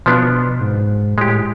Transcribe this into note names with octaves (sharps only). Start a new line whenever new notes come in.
B2 F3 B3 D4
G#2
A2 G#3 G4